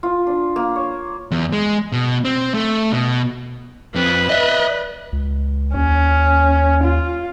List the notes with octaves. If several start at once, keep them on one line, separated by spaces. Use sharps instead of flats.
F4
D4
A#3
C#5
E2
G#3
B2
C4
A3
B2
F2 F3 B4
D#5 E5
C#2
D#2 C#4
F4